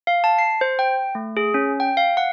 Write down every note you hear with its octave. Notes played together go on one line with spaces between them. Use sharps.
F5
A5
C7
C5
G5
A3
G#4
C#4
G5
F5
F#5